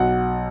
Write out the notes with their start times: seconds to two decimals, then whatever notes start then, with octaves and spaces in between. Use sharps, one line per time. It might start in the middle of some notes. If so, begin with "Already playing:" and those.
Already playing: B1 F#5